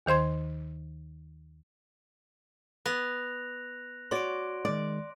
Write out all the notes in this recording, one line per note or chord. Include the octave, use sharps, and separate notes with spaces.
D#2 D#3 C5 C6 G#6
B3 F#6 A#6 F7
F#4 C#5 D5 C6 D7
D#3 G#3 D5